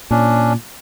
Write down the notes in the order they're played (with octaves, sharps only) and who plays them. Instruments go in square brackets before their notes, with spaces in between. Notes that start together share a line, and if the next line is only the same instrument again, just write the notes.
[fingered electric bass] A#2 [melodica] C#4 D4